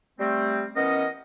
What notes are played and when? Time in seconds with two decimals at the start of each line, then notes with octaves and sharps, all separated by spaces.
0.19 G3 A3 C4
0.75 E3 B3 C#4 A#4 D#5